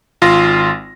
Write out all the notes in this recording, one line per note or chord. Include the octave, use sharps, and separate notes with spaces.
G#1 F4 C6 A#6